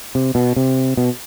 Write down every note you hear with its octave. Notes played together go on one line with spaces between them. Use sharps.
C3
B2
C3
B2